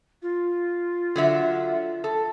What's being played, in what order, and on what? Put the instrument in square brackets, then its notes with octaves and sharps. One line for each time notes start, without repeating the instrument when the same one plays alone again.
[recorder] F4
[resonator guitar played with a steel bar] D3 F#3 E5
A4